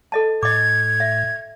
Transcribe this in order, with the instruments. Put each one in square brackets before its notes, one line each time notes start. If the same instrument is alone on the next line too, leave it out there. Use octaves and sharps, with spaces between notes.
[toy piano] A4 D#5 A5
[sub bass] A2 [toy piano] D#5 D6 [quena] G#6
[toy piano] E5